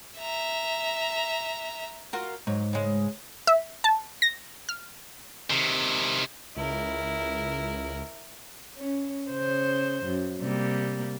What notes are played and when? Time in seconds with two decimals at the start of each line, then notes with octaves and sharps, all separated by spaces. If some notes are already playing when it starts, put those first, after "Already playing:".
0.19 E5 A#5
2.13 F4 F#4 A#4
2.47 G#2 F#3
2.73 C#3 G#3
3.47 E5
3.84 A5
4.22 A#6
4.69 F6
5.50 C3 D#3
6.56 C#2 E4 A#4
8.77 C#4
9.30 C#3 C5
10.04 F#2
10.40 C3 G3 A#3